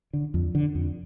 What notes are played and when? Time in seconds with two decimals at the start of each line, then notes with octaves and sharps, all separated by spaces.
0.13 D3
0.34 F2
0.55 D3
0.75 F2